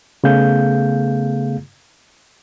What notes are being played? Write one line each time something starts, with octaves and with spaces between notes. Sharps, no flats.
C#3 A3 B3 G#4 F5 G6